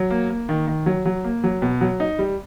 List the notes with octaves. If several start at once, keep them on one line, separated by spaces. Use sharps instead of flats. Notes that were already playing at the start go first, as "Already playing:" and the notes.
Already playing: F#3
A#3
A#3
D#3
D#3
F#3
F#3
A#3
F#3
B2
F#3
D#4
G3